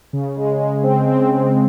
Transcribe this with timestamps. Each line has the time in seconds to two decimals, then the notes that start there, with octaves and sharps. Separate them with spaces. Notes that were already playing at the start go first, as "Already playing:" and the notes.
0.13 C#3
0.37 G#3
0.60 G#3
0.83 C4
1.07 C4
1.31 C4